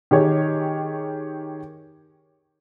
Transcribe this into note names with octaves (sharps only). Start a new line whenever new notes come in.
D#3 G4 G#4 C#5